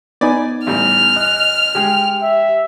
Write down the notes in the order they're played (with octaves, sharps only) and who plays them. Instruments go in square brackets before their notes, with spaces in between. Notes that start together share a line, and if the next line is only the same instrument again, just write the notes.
[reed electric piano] B3 D#4 [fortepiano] D5 G#5 B5
[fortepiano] A1 G3 [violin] F6
[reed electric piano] D#5 F#6
[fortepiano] G#3 [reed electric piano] G4 G5
[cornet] E5